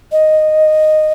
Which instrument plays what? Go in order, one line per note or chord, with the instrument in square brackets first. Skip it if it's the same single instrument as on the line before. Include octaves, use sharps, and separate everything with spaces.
[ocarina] D#5